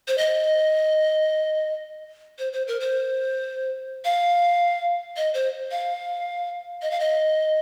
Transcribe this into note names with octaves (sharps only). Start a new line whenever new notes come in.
C5
D#5
C5
C5
A#4
C5
F5
D#5
C5
F5
D#5
F5
D#5